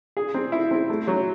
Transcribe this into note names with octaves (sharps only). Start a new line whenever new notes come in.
G#4
C4
E4
C4
A3
F#3